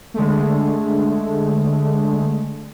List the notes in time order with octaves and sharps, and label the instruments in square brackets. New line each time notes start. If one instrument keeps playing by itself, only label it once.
[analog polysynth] D3 G#3 A3